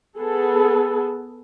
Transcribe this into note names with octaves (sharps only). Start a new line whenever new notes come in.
B3 G#4 A4